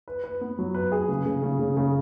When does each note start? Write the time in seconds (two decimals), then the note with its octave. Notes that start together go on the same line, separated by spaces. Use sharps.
0.08 B4
0.24 B4
0.41 B3
0.59 F#3
0.75 B4
0.92 G#4
1.09 C#3
1.26 C#3
1.42 C#3
1.59 C#3
1.77 C#3